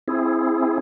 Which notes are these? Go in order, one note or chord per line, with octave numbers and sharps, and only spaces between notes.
C4 E4 G#4